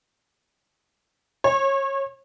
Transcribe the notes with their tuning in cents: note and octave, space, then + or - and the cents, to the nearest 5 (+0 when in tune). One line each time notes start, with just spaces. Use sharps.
C#5 -30